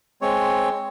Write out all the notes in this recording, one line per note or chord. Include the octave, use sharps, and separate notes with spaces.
G#3 C4 C#5